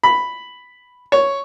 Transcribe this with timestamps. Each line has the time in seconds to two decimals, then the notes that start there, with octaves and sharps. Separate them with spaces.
0.03 B5
1.12 C#5